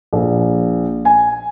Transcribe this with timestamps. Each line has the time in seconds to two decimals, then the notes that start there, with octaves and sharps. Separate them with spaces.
0.13 A#1
1.05 G#5